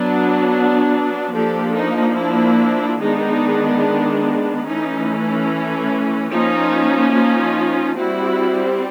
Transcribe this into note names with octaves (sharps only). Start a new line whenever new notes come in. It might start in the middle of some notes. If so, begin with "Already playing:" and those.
Already playing: F#3 B3 D4
F3 A#3 D4 G4 A4
D#4
D4 E4
D#3 G#3 B3 D4 D#4
E3 A3 C#4 D#4
F3 A#3 C#4 D#4 F4
D#4 F4
G3 C4 E4 F#4